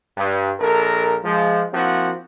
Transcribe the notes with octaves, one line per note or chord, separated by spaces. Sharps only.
G2
A#1 A4 A#4
F3 G#3
F3 A#3 C4 E4 F#4